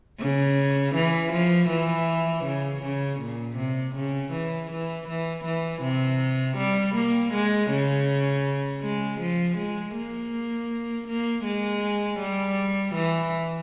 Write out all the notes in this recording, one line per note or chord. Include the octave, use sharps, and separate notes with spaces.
C#3
E3
F3
E3
C#3
C#3
A#2
C3
C#3
E3
E3
E3
E3
C3
G3
A#3
G#3
C#3
G#3
F3
G#3
A#3
A#3
G#3
G3
E3